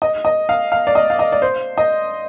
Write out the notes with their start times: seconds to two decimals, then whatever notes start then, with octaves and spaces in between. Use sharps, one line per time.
0.02 D#5
0.25 D#5
0.49 F5
0.72 F5
0.87 D5
0.95 D#5
1.10 F5
1.19 D#5
1.32 D5
1.42 C5
1.78 D#5